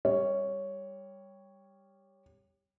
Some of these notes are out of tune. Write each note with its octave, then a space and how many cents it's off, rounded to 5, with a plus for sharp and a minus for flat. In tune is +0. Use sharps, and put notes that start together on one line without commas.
G3 +10 C#5 +0